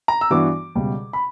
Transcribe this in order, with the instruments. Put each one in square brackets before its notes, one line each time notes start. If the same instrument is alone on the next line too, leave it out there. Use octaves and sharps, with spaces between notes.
[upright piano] A#5
E6
[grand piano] G2 E3 B3 D4 F#4 [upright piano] D6
[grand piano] C#2 B2 G3
[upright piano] B5